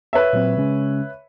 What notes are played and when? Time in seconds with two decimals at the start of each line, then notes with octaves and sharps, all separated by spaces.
0.13 B4 C#5 E5
0.33 A#2 F#3 C4
0.57 C#3 G#3 C#4